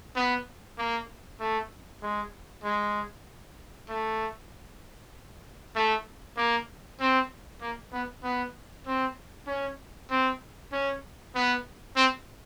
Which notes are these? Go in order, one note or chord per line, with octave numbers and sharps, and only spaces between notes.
B3
A#3
A3
G#3
G#3
A3
A3
A#3
C4
A#3
B3
B3
C4
C#4
C4
C#4
B3
C4